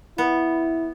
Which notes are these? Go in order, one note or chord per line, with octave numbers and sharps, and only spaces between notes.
B3 E4